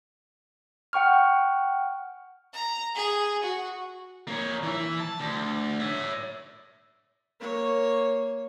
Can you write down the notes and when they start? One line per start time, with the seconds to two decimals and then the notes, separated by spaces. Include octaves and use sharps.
0.93 F#5 G5 C#6 F6
2.54 A#5
2.95 G#4
3.43 F#4
4.28 A#3 C#5
4.63 E3 E4
5.00 A5
5.20 D2
5.80 C#5 E5
7.40 A#3 C#5